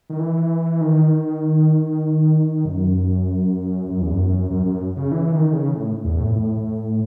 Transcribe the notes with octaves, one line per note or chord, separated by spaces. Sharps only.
D#3
E3
D#3
F#2
F#2
E2
F#2
F#2
F#2
C#3
E3
D#3
C#3
A2
E2
A2
A2